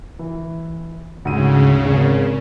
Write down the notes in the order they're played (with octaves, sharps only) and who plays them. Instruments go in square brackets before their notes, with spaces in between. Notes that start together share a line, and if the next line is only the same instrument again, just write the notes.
[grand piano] E3
[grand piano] D2 G#2 D#7 [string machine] C#3
[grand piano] G#1 C#4